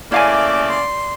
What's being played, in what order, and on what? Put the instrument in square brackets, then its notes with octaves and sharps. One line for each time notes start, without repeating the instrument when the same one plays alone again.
[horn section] C#3 A3 A#3 [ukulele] E4 F5 G#5 [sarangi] D5 [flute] D6
[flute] C6